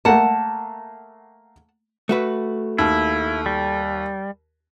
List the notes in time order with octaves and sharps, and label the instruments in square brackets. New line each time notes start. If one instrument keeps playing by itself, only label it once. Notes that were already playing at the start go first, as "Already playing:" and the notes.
[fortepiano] A3 A#3 [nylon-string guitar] F#5 A5
[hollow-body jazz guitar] A3 F#4 B4
[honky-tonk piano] D#2 [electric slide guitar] E4
[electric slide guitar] G3